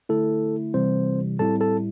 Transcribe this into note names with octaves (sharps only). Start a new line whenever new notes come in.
D3 A3 E4 A4
C3 E3 G3 C4 C5
A2 G3 C4 E4 A4 A5
A4 A5